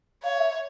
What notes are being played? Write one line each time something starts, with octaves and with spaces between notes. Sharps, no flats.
C#5 F5
F5
E5